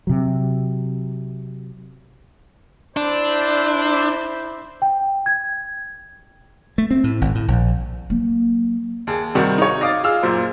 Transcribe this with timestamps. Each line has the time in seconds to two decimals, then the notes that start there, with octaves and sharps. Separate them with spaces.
0.07 C3 F#3
2.97 D4 E4 C5
4.82 G5
5.26 G#6
6.78 A3
6.91 C4
7.04 A2
7.21 G#1
7.35 A2
7.48 A#1
8.10 F#3 A#3
9.07 D#2 G#4 A5
9.35 C3 D#3 G3 F#4
9.58 D#4 C#5
9.81 D#5 F5 D6 D#6 A6
10.04 F4 G#4 F5 E6 F6
10.23 F#2 A#2 C5